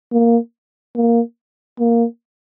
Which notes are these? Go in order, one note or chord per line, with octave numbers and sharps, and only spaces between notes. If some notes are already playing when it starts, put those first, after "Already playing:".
A#3
A#3
A#3